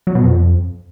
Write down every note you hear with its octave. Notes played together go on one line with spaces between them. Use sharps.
F#3
B2
F2